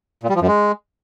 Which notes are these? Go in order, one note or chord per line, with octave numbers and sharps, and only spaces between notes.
A#2
G3
F3
F#2
G#3